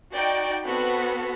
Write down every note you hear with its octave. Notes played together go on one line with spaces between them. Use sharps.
D#4 F#4 D5 G5
B3 C4 F#4 A4 B5